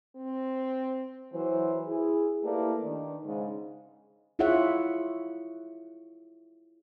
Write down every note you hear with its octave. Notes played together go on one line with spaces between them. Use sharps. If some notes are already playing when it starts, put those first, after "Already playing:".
C4
E3 F#3 C5
E4 G#4
A3 A#3 E4 G4 B4 D5
D#3 D4
G#2 C#3
E4 F4 G#4 C#5 E5 F#5